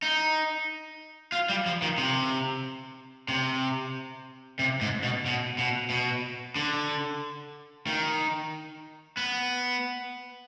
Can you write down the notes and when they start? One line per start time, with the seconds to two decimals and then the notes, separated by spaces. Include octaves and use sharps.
0.02 D#4
1.32 F4
1.49 G3
1.66 F3
1.82 D#3
1.98 C3
3.28 C3
4.59 C3
4.81 G#2
5.03 B2
5.25 B2
5.58 B2
5.90 B2
6.56 D3
7.87 D#3
9.17 B3